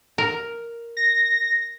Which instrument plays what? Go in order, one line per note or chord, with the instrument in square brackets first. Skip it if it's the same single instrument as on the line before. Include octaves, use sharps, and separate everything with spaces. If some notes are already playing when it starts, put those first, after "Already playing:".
[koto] A#4
[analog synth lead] A#6